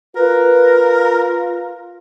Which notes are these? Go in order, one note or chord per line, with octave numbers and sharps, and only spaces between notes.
F4 A#4 B4